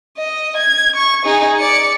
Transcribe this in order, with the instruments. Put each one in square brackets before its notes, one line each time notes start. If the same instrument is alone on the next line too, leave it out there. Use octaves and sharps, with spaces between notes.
[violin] D#5
G#6
C#6
D#4 G#4
D5 C#7